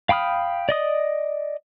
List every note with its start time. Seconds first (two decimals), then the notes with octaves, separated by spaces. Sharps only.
0.09 F5 G5 B5 D#6 F6
0.69 D5 D#5 D#6